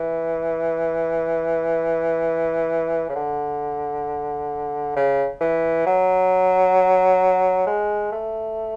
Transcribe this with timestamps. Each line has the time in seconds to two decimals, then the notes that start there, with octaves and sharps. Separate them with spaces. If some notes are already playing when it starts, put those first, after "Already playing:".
Already playing: E3
3.09 C#3
3.15 D3
4.96 C#3
5.41 E3
5.86 F#3
7.66 G#3
8.12 A3